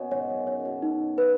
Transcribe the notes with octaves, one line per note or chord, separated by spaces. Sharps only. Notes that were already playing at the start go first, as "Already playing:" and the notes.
Already playing: B2 B3 C#4 C#5
G#2 G#3 C#5
F#2 F#3
C#3 C#5
C#3
B2
D#4
B4